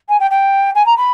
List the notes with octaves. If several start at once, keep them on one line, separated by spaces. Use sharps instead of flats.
G#5
G5
G5
G#5
A#5
B5